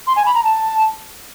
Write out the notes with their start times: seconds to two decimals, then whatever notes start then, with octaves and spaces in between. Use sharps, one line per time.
0.07 C6
0.16 G#5
0.26 B5
0.35 A#5
0.44 A5